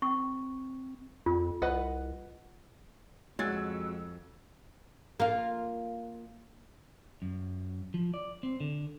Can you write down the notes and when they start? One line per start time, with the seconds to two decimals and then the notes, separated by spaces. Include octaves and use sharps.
0.02 C4 C#6
1.26 F2 F4
1.62 C2 B4 D#5 F#5
3.39 F2 F#3 G#3 E6 G#6 A6
5.20 A#3 F4
7.22 F#2
7.94 F3
8.14 D5
8.43 C4
8.60 D3